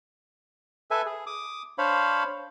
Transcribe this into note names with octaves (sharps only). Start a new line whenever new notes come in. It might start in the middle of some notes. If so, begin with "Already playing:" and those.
A4 B4 E5 G#5
G#4
D6 D#6
D4 C5 C#5 F5 B5